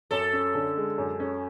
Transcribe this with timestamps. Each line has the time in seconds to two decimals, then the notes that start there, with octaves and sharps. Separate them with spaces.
0.11 F#2 A4
0.33 C#4
0.55 D3
0.77 G#3
0.98 F#2
1.20 C#4